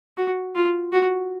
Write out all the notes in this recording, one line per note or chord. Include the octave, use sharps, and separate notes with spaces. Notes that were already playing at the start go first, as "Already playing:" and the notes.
F#4
F4
F#4